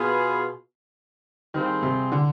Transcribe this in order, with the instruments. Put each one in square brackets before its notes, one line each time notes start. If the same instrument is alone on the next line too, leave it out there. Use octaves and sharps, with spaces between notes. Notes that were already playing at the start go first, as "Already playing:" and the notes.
Already playing: [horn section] B2 B3 F4 G#4
[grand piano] D#3 [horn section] G3 C4 F4 G#4
[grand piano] C3
D3